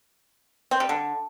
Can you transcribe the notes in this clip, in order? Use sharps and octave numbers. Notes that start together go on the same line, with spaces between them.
C4
G3
D3